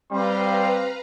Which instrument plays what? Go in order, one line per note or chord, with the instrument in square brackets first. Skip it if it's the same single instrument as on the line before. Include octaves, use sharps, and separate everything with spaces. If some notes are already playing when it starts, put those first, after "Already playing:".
[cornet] G3 [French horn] C4 [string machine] B4 F5 A#5 [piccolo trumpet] C6